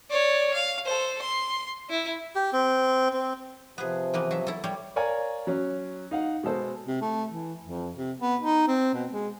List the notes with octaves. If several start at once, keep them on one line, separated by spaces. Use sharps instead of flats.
C#5 D5
F5
A4 C5
C6
E4
G4
C4
C4
C3 F3 B3 G#4
E3 A#3 B3
F#3 E5
E4 A4
G3 C#5
A#4 C#5 D5 F5 G#5 A#5
F#3 C#4
D#4 F5 F#5
B2 G#3 A4 C5
C3
A3
E3
F2
C3
B3
D#4
C4
B2
G#3